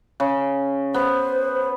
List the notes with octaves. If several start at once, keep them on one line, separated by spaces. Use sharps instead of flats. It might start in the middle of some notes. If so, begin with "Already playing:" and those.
C#3
B3 C5